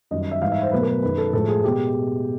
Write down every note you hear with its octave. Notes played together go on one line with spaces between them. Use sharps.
F#2 D#3 G3 D#5
D#5
E5
G#2 E3 G3 F5
E5
C5
B2 F#3 A3 B4
A#4
B4
F#2 D#3 G#3 B4
A4
A2 F3 G#3 A4
G#4
B2 G#3 G4